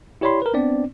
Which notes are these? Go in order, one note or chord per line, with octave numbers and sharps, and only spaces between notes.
E4 G4 C#5 D5 B5 C6
A#4 B4
B3 C4 D4 D5